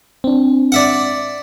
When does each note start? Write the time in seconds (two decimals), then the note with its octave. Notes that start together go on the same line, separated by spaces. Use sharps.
0.24 C4 D4
0.72 D5 E5 F#5